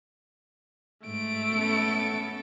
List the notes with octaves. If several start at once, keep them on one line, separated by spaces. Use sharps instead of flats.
G#2 A3 D7
B3 C#4 A4